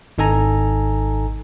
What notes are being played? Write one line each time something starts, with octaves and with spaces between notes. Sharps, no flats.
G#1 D#4 A4 G#5 A#5